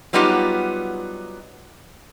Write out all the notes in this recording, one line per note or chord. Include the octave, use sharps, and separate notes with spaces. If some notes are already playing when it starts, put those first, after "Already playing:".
F#3 G3 B3 D#4 F4 G4